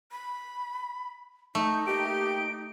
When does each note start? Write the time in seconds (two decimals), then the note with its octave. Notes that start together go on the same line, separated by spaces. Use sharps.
0.12 B5
1.55 A3 D#4
1.87 A#3 D#4 G4 D7